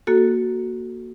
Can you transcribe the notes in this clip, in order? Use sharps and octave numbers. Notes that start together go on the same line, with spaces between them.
A#3 F#4 A4